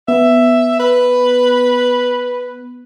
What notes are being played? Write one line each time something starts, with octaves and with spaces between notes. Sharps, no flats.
B3 E5
B4